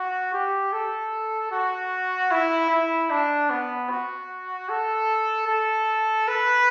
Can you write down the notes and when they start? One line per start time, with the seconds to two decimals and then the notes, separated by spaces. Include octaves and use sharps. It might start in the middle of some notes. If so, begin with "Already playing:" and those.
Already playing: F#4
0.33 G4
0.72 A4
1.52 F#4
2.31 E4
2.70 E4
3.10 D4
3.50 B3
3.90 F#4
4.69 A4
5.48 A4
6.28 B4